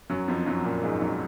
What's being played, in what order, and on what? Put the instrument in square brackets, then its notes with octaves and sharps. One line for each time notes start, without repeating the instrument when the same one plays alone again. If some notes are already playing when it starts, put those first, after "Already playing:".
[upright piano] F#2 F#3
F2 F3
F#2 F#3
A#2 A#3
G#2 G#3
F#2 F#3